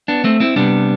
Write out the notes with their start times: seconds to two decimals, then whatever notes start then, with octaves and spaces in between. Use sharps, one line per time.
0.08 B3 D4
0.24 A3 C4
0.40 C4 E4
0.56 C3 G3 B3 D4